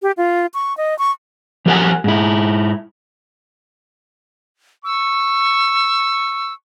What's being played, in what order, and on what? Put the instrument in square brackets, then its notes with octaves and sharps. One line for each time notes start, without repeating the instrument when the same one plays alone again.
[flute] G4
F4
C#6
D#5
C#6
[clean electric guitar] F3 G4 A#4 C#5 F#5 G#5
G#2 E4
[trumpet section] C#6 [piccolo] E6